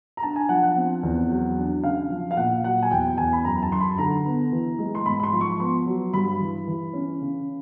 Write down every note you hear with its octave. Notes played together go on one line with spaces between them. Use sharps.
A#5
D4 A5
G#5
F3 F#5
F#5
C4
E2
F#3
D4
C#3 F5
F3
F5
A#2 F#5
F#3 F#5
G#5
E2 G5
E2 G#5
B5
F#2 A#5
A5
F#2 C6
B5
D3 A#5
B3
E3
G#3
C6
G#2 B5
B5
C6
F3
C#6
B3 C6
F#3
G2 B5
E3
E3
C#4
C#3